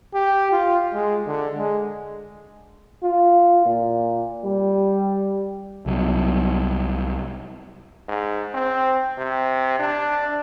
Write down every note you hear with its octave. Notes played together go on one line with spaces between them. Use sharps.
G4
F4
G#3
D3
G#3
F4
A#2
G3
C2 F#3
G#2
C4
C3
D4